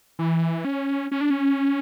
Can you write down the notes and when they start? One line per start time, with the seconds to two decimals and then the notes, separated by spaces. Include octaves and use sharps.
0.19 E3
0.65 C#4
1.11 C#4
1.21 D4
1.30 C#4